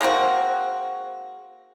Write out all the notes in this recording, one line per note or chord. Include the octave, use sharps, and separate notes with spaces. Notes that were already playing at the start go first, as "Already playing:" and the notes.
G#3 A#3 C4 F#4